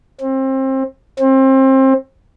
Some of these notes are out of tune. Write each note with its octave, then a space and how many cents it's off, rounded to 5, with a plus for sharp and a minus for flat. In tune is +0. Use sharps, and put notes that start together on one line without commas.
C4 +30
C4 +30